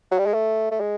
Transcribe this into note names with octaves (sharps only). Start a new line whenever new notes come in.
F#3
G3
G#3
A3
A3
G#3